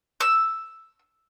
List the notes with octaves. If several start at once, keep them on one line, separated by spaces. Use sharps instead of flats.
E6